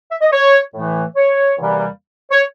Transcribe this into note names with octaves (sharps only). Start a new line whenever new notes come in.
E5
D#5
C#5
A2 E3 A3
C#5
E2 C3 E3 G3 A#3
C#5